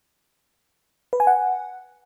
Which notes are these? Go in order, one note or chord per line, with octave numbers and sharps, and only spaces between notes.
B4
G#5
F#5